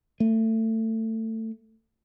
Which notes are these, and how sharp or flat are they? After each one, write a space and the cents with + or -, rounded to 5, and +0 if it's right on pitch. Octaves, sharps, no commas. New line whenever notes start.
A3 +25